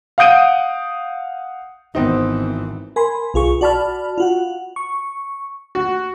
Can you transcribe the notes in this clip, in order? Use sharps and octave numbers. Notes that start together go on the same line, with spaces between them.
F5 F#5 D#6 G6 D7 D#7
G#1 E3 B3 C4 D#4
A#4 G#5 B5 C6
B1 F4 G#4 C#6
F#4 D5 A5 B5 F6
F4 F#4 F#5
C#6
F#4